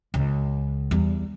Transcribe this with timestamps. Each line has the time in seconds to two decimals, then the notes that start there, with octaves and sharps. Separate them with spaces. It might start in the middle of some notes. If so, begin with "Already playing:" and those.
0.14 C#2
0.91 E2 G3